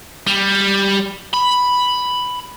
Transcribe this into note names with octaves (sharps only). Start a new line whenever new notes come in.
G3
B5